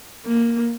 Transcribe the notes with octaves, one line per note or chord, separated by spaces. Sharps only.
A#3